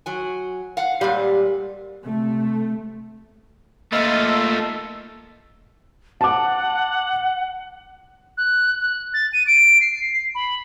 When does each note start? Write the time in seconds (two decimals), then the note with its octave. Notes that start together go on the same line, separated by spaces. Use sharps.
0.06 F#3 G#5
0.77 F5 F#5
1.01 A#2 G3 G#3 F5
2.03 C3 A3
3.93 A3 A#3 F4 D#5 B5 E6
6.21 F#5 A5 D6
8.38 F#6
8.81 F#6
9.14 A6
9.33 D#7
9.47 D7
9.81 C7
10.35 B5